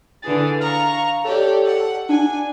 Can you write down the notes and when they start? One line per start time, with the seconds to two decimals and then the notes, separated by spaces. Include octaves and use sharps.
0.22 D3 E3 G#4 A6
0.60 F5 A#5 C#6
1.24 G4 A4 C#5 D5
1.65 F#5
2.09 D4 G#5